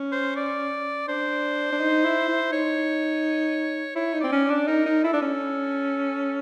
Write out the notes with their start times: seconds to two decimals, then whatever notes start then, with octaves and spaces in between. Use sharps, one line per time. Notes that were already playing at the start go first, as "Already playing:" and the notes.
Already playing: C#4
0.12 C5
0.36 D5
1.08 D4 C5
1.72 D4
1.80 D#4
2.04 E4
2.29 E4
2.52 D#4 C#5
3.96 E4 C#5
4.14 D#4
4.21 C4 D5
4.32 C#4
4.45 D5
4.50 D4
4.67 D#4 A#4
4.86 D#4
5.04 E4 A4
5.13 D4
5.22 C#4